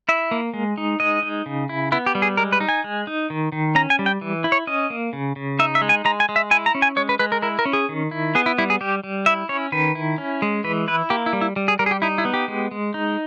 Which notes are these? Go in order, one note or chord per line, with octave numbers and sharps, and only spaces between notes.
E4 E5
A#3
G#3
D#4
G#3 D#5
D#4
C#3
E4
B3 E4
G4
G3
G#4
G#3 A#4
B4
D#4
G#5
G#3
D#4
D#3
D#3
C#4 A#5
G#5
G3
G5
E3
E4
C#5
C#4 D#5
A#3
C#3
C#3
D#4 E5
E5
G#3
G#5
G#3 A#5
G#5
G#3
E5
E4 G#5
A#5
C#4
G#5
G#3 C#5
B4
G#3 B4
A#4
E4 A#4
A#4
C#4
G#4
D#3
E4
B3 G#4
E4
G3 E4
G#4
G3 G4
G3
E4 E5
C#4 C#5
D#3 B4
E4
C#4
G#3
E3 B4
E4 B4
A#3 G4
E4
G3
E4
G3
G#4
G3 A#4
G#4
G4
D#4 E4
E4
B3
G4
G#3
G#3
D#4